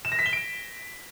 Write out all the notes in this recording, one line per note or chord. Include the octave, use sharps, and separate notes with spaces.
E7
A#6
B6
G7
D7